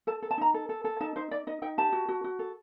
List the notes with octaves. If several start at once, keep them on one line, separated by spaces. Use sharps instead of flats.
A4 A5
A4
A5
D#4 A#5
A4
A4
A4
D#4 A5
D#4 C5
D#4 D5
D#4 D#5
D#4 G5
G4 A5
F#4
F#4
F#4
A4